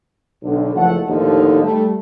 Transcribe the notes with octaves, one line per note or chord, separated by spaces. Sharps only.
B1 D3
F#1 F3 A3 A4 F#5
D#2 A2 D3 F3 A3 D#4
G3 A3